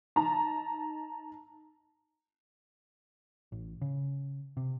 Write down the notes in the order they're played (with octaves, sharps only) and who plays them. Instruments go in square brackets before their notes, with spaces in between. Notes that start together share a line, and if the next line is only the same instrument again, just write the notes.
[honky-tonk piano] D#4 A5 A#5
[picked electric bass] A1
C#3
C3